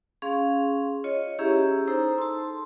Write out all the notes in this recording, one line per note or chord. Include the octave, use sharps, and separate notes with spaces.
C#4 G#4 F5 C6
F4 C#5 D#5
C#4 E4 G4 G#4 E5 A#5
D#4 A4 C5 A#5 E6
A5 C6